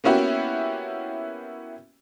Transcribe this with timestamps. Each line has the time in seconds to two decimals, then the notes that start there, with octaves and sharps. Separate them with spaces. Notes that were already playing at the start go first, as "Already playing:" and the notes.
0.04 A#3 B3 C#4 E4 F#4 G4